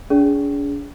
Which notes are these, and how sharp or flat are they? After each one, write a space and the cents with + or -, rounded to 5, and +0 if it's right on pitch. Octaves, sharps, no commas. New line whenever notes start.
D4 -45 G#4 +0 D5 -45